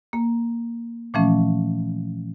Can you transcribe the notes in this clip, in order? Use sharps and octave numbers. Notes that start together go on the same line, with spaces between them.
A#3
A#2 E3 F3 A3 C#4